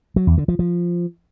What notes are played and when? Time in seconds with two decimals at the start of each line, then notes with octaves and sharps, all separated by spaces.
0.16 F#3
0.27 E2
0.38 D3
0.48 F3
0.59 F3